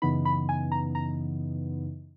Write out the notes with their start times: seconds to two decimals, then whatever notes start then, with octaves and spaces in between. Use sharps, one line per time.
0.02 F#2 C#3 E3 B3 D#4 B5
0.25 B5
0.49 G#5
0.72 A#5
0.95 A#5